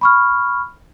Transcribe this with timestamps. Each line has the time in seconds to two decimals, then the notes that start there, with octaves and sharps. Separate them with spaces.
0.01 B5 C#6 F6